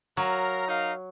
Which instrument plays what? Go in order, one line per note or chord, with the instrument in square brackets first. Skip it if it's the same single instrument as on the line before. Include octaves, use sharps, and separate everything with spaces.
[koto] F#3 [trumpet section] A#4 F5 A#5
[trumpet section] D#4 A#4 F5